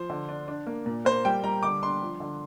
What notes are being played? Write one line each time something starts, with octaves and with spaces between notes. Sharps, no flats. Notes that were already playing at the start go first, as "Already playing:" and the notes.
Already playing: F3 C5
D3
D4
D4
A#3
A#2
A#3 C5
G3 G5
G3 A#5
D3 D6
D4 C6
F3
D3